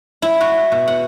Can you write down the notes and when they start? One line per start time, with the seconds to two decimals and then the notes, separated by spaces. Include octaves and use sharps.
0.22 E4
0.41 F#4
0.72 B2
0.88 F#5